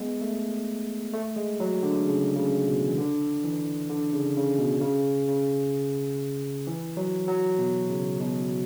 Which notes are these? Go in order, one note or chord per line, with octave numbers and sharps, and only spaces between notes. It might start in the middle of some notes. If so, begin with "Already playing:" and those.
Already playing: G#3 B3
A3
A3
G#3
F#3
D3
C#3
C#3
B2
E3
D3
E3
D3
C#3
C#3
B2
C#3
C#3
E3
F#3
F#3
B2
C#3
B2